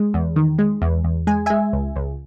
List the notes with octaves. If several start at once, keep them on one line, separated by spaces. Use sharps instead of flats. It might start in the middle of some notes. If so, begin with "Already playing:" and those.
Already playing: G#3
E2
D#3
G#3
E2
E2
G#3 G#5
G#3 E5 G#5
C#2
C#2